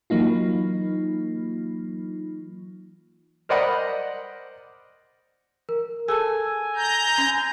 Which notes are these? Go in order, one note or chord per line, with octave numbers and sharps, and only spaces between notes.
E3 F#3 A#3 D#4 F4
A#4 C5 D5 D#5 F#5 B5
A#4
G#4 A4 G#5 A5 E6
A#5 G6
C#4